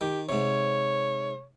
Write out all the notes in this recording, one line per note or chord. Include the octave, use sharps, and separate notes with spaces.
D#3 G4
G#2 C3 C#5